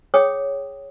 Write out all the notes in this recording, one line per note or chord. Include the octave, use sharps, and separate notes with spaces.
G#4 C#5 G5 D#6